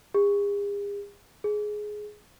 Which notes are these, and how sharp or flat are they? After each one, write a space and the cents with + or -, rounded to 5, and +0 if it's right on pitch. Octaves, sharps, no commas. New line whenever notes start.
G#4 -45
G#4 +15